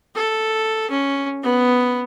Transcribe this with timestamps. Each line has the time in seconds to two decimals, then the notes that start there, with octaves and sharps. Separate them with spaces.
0.15 A4
0.91 C#4
1.43 B3